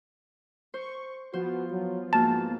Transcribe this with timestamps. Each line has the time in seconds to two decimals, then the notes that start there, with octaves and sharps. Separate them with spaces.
0.74 C5 C#6
1.33 F3 B3 F4 F#4 C5
1.71 F#3
2.13 G#2 A#3 F#4 A5